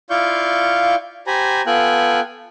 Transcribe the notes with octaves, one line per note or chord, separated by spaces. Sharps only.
E4 F4 D5 F5 C#6 G6
G4 C5 G#5 A#5 B5
B3 F4 A4 G5 G#5 F#6